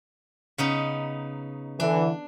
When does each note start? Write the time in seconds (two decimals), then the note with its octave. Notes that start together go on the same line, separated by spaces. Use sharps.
0.58 C#3 B3 D#4
1.80 D3 E3 D4